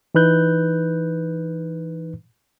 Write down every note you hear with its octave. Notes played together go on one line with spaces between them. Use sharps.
E3 D#4 B4 F#6 G6